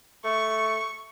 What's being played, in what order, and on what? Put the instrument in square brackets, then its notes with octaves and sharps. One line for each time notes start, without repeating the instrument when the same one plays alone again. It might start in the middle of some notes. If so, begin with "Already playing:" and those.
[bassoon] A3 [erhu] C#6